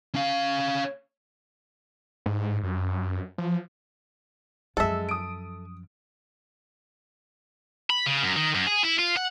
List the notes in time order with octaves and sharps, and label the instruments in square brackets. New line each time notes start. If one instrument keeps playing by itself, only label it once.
[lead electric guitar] C#4 F5
[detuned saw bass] G#2
F#2
F3
[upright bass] F#2 F3 [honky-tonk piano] G#3 [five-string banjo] A4 E5
[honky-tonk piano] D#6 D7
[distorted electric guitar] B5
C#3
F#2
D#3
F#2
G#4
E4
F4
F#5